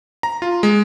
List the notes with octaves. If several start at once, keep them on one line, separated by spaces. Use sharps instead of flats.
A#5
F4
G#3